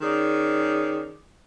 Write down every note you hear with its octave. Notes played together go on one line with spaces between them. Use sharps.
D#3 C#4 G#4 D5